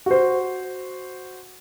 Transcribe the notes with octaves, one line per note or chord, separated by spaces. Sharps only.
F#4 C5